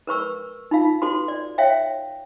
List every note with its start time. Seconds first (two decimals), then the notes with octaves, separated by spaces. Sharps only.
0.07 A#4 B4 C#6 E6
0.71 D#4 F4 F5
1.02 F#4 A4 B4 C6
1.28 D5
1.58 C#5 E5 F5 G5